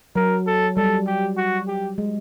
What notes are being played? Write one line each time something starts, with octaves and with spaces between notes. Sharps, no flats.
F#3 A#4
A4
G3 A4
G4
F#4
G4
G#3